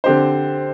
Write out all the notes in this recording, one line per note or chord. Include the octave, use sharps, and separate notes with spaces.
D3 C4 G4 C5